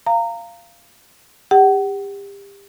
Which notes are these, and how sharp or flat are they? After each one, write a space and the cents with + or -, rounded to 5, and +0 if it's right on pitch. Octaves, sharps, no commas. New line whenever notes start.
F5 -15 A#5 -20
G4 +30 F#5 +35